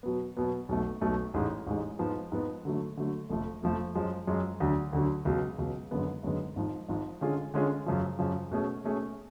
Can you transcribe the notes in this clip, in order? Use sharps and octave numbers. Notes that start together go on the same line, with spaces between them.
B2 F#3 B3
B2 F#3 B3
B1 B2 A3
B1 B2 A3
A1 G#2 G#3
A1 G#2 G#3
G#2 F3 B3
G#2 F3 B3
D3 F#3 A3
D3 F#3 A3
F1 F2 F3 A3
F1 F2 F3 A3
F#2 F3 G#3
F#2 F3 G#3
D2 D3 F#3
D2 D3 F#3
C#2 B2 F#3
C#2 B2 F#3
G#1 F#2 D3 G#3 B3
G#1 F#2 D3 G#3 B3
G#1 G#2 F3
G#1 G#2 F3
D3 G#3 C#4 F4 G#4
D3 G#3 C#4 F4 G#4
F#2 C#3 F3
F#2 C#3 F3
B2 A3 C#4 G#4
B2 A3 C#4 G#4